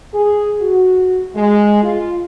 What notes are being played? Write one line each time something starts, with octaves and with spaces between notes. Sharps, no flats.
G#4
F#4
G#3
F4